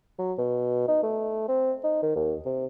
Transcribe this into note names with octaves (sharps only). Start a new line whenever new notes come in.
F#3
B2
D#4
A3
C4
D#4
D#3
D#2
C3